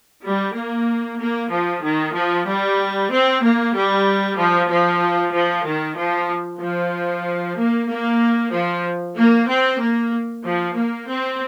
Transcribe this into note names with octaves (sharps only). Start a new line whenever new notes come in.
G3
A#3
A#3
F3
D#3
F3
G3
C4
A#3
G3
F3
F3
F3
D#3
F3
F3
A#3
A#3
F3
A#3
C4
A#3
F3
A#3
C4